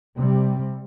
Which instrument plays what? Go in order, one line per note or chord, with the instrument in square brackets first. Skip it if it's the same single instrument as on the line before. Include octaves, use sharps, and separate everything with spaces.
[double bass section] C3 G3